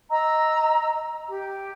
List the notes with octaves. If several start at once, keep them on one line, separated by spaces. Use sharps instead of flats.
D#5 A#5 E6
G4